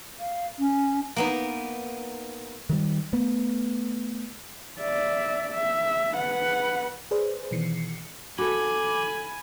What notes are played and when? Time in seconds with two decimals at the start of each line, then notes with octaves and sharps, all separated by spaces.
0.20 F5
0.59 C#4
1.16 A#3 B3 D#4
2.70 D#3 G3
3.13 A3 B3
4.81 D5 E5
5.54 E5
6.15 B4 F#5
7.11 G#4 B4 C5 D5
7.51 B2 D#3 E3 C7 C#7
8.38 F#4 A4 G#5 B5 D6